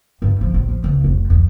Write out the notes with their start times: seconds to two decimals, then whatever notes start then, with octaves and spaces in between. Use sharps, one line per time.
0.22 G2
0.41 F3
0.54 A1
0.69 F3
0.84 C#2
1.04 F1
1.30 F2